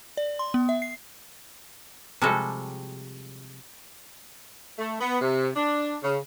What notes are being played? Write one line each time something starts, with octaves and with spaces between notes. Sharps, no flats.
D5
C6
B3
E5
C7
C3 F3 G3 G#3 F#4 A4
A3
B3
C3
D4
C#3